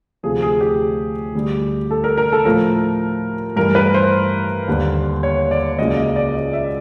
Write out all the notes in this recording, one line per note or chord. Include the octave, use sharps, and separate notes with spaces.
D2 C3 F3 A3 G#4
G#4
G4
D2 D3 G3
A4
A#4
A#4
A4
A2 F3 A3 A#4
G2 E3 A3 A#4
B4
C5
D#2 D3 G3 A#3
C#5
D5
C#2 C#3 F#3 A#3 D#5
D5
D#5
D5
D#5
E5